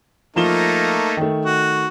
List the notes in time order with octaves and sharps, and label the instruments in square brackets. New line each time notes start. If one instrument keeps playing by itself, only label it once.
[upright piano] F3 E7 G7 [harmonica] A3 A#3 D#4
[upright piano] D#3 A3
[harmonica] F#4